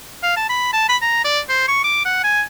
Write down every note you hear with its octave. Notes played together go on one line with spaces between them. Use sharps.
F5
A5
B5
A5
B5
A#5
D5
C5
C#6
D6
F#5
G#5